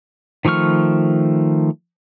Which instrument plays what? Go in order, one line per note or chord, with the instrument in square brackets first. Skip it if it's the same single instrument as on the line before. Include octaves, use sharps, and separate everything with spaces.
[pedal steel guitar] D#3 F3 A3 C#6 F6